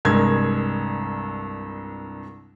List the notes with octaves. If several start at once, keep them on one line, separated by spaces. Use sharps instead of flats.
C2 G2 G#3 A#4 G#6